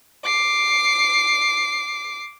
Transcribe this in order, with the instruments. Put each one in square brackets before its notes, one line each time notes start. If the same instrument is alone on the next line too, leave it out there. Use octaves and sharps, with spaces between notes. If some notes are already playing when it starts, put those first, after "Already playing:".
[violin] D6 C7